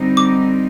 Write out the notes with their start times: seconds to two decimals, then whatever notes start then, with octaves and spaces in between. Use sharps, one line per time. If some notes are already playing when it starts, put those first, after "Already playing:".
Already playing: D3 G3 C4 D#4
0.17 D6